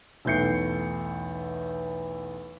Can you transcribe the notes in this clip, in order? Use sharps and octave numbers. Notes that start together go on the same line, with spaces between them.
B1 E2 A3 G6 C7 C#7